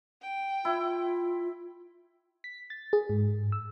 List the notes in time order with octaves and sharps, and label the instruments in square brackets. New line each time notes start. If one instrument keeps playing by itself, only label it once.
[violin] G5
[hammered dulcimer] E4 [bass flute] F4
[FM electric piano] B6
A6
G#4
G#2
E6